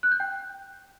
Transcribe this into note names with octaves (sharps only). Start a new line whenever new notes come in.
F#6
G6
G5